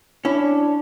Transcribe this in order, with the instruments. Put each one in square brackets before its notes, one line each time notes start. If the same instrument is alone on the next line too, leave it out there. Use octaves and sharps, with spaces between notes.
[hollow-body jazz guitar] C#4 E4 [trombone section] D4